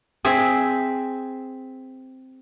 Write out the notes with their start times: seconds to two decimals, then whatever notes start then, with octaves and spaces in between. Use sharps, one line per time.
0.25 C4 G#4 E5